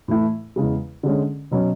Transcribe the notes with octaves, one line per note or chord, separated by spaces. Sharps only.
A2 E3 A3 E4
E2 C#3 G#3
D3 G#3 C#4
B2 F#3 C#4